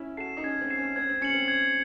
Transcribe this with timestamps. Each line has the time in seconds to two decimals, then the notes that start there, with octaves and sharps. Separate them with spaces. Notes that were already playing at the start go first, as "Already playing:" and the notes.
Already playing: C#4 E4
0.17 F#4 A4 C7 E7
0.37 D#4
0.44 C#4 G#6
0.61 C4
0.70 C7 E7
0.78 C#4
0.96 C4 G#6
1.09 C4
1.21 C#4 C#7 F#7
1.34 C4
1.48 G#6